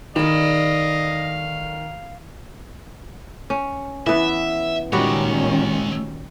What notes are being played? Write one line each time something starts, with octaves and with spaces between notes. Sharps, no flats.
B2 D3 D#3 D5 D#5 F5 B5
C#4
E3 B3 E5
A#2 D#3 G3 G#3 C#4 F#4 C#5